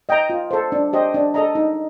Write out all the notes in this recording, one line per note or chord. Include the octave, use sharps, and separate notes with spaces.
D#5 G5 A#5
F4
A4 C5
D4
G4 C5 D#5
D4
A4 D#5 A#5
D#4